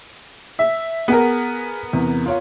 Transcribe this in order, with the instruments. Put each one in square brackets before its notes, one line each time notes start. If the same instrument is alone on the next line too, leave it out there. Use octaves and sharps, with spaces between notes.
[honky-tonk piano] E5
[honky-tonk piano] B3 A#4 [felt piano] G#4 F#5
[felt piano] E2 C3
F4 C#5 F5